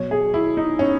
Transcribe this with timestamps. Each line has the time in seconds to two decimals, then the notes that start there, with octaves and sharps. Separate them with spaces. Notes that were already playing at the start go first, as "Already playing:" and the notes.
Already playing: B2 F#3 C#5
0.11 G#4
0.34 E4
0.57 D#4
0.79 C#4